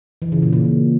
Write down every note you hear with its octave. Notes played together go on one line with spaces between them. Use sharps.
E3
C#3
A#2
A#2